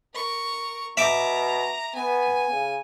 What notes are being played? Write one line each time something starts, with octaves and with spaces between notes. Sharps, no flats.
A#4 C#6
B2 E5 A#5 D6
B3 G#5
C#3